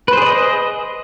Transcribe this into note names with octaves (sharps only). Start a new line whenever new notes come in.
G#4 B4 C5 D5 D#5